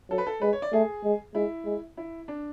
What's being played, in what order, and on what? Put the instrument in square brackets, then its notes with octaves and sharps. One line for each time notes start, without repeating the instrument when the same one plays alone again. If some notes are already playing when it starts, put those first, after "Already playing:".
[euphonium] F#3 [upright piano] A4
[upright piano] B4
A4
[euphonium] G#3 [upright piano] B4
[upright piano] C#5
D5
[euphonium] A3 [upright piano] G#4
[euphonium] G#3
[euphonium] G#3 [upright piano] E4
[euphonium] G#3
[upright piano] E4
D4